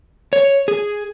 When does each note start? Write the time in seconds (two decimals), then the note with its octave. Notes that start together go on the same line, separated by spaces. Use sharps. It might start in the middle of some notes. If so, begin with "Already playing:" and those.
0.33 C#5
0.68 G#4